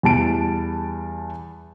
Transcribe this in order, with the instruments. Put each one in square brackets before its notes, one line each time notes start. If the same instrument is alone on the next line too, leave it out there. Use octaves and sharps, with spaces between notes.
[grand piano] E2 G3 A5 D7